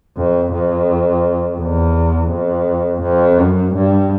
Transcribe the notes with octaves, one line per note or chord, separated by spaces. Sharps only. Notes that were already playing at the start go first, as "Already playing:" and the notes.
F2
F2
E2
F2
F2
F#2
G2